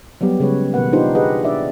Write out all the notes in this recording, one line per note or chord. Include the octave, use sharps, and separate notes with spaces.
F#3 G3 B3 G4
C#3 G#3 B4 C#5
B2 D#3 A#3 B4 F#5
D4 D#4 F4 G4 B4 C5
G4 G#4 B4 D#5 F#5
D4 D5 E5